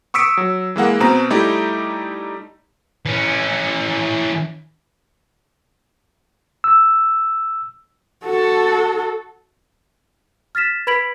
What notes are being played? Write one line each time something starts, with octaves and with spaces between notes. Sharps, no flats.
C#6 D#6 E6 B6 C#7 D7
F#3
E3 G#3 A#3 F#5
B2 B3 C4 A#5
G3 A3 D#4 E4 G4
E3 C#4
E6
F#4 A4
F6 A6 B6 E7
B4 B5 G#6 B6 D7 F#7